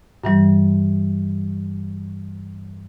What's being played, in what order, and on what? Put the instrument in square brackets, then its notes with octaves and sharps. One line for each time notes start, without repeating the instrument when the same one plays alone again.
[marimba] G2 E3 G3